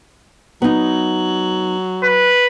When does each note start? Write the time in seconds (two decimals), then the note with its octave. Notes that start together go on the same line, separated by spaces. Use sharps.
0.62 F#3 B3 D#4
2.03 B4